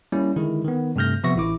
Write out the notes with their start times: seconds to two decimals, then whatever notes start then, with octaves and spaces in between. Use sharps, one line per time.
0.12 G3 A#3 C#4 E4
0.36 D3 D#3 G#3 E4
0.65 D#3 B3
0.96 G2 C3 A3 F6 G6 A#6
1.24 C3 F3 B3 E5 C#6 A#6
1.36 A1 E4 D6